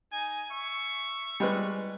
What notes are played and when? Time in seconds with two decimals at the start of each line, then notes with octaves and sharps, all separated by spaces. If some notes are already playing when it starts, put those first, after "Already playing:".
0.13 D#4 G#5
0.51 E5 C#6
1.40 G3 G#3 B4